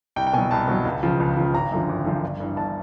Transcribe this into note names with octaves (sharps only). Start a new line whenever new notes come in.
C2 G5
G5
B2 F#3 G#5
C2 A5
B2 F#3
C#2
C#3 F3
C#2
C#3 F3
G#1 A#5
F#2 D3 F3
G#1
F#2 D3 F3
G1
G2 E3
G1 A5